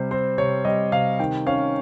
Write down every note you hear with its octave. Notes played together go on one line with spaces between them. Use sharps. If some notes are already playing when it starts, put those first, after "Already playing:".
Already playing: C3 G3 C5
C4 C5
C3 C#5
G3 D#5
C3 F5
D#3 G5
C#4 F5